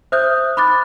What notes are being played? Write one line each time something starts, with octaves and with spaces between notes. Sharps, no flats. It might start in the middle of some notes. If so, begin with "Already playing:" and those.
C5 E5 D#6 F#6 G6
B5 D6 F#6 A6